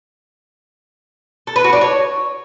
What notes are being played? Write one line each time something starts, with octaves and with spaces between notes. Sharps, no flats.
A4
B4
F#4
D4
C#5